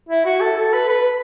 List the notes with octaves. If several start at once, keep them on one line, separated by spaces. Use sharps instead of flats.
E4
F#4
A4
A4
B4
B4